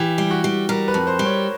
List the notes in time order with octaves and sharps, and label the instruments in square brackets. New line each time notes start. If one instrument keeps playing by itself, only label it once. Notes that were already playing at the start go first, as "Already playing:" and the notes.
Already playing: [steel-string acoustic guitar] E3 [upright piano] G4
[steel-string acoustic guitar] G3
[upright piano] F#4
[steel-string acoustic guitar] G3
[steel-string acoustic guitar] G3 [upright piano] A#4
[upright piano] B4
[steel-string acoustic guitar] F2
[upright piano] C5
[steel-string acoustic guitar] G3
[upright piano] C#5